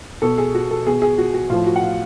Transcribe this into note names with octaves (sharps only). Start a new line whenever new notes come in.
B2 A4
G#4
F#4
A4
B2 G#4
G#4
F#4
F#4
A2 F3 F4
F#4
F#5
F5